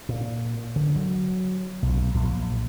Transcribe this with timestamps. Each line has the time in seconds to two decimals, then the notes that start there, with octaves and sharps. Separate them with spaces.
0.09 A#2
0.76 D3
0.96 F#3
1.82 B1
2.14 A#1